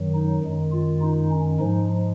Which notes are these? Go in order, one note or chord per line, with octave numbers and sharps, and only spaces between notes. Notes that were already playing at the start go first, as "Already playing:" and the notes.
Already playing: F#2 D#3 F#3
D#4
F#2 D#3 G#3
F4
D#4
C#4
G#2 F3 G#3 D#4